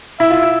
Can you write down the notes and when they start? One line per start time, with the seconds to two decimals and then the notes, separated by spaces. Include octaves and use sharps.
0.20 E4 E5
0.30 F4
0.43 E4